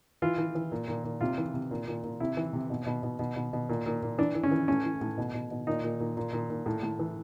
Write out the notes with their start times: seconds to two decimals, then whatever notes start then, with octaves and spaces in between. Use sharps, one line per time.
0.22 E3 F4
0.38 E3
0.55 E3
0.72 A#2
0.88 A#2
1.04 A#2
1.21 C3 F4
1.38 E3
1.54 C3
1.71 A#2
1.88 A#2
2.04 A#2
2.20 C3 E4
2.37 E3
2.53 C3
2.70 B2
2.86 B2
3.03 B2
3.19 B2
3.36 B2
3.53 B2
3.69 A#2
3.86 A#2
4.03 A#2
4.18 E3 D4
4.35 E3
4.43 C#4
4.51 E3
4.68 A2 C#4
4.85 E3
5.01 A2
5.18 B2
5.34 B2
5.51 B2
5.67 A#2 D#4
5.84 A#2
6.00 A#2
6.17 A#2
6.33 A#2
6.50 A#2
6.66 A2
6.83 A2
6.99 E3